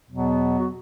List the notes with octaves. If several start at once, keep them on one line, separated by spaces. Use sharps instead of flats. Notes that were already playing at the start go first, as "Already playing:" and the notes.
E2 B2 F#3 B3
F#4